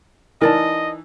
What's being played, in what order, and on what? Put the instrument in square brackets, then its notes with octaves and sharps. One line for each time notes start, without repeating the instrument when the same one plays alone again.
[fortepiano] E3 D#4 [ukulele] A#4 D5 A5 [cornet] D#5